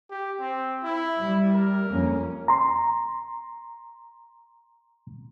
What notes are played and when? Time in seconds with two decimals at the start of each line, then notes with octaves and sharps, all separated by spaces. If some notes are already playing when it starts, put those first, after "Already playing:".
0.11 G4
0.40 C4
0.84 E4
1.20 G3
1.54 A#4
1.90 F2 A#3 C#4
2.48 A#5 C6